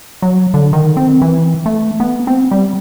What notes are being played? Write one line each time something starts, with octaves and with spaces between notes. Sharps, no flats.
F#3
D3
D#3
C4
E3
A3
B3
C4
G3